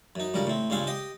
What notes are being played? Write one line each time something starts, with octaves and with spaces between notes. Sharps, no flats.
F#2 D#4
C#2 G2 G3 A#4
A2 C4
C#2 G2 C4 F5 G#5
G4 D#5